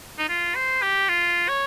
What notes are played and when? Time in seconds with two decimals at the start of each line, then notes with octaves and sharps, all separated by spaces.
0.19 D#4
0.29 F4
0.56 C5
0.82 G4
1.09 F4
1.49 C#5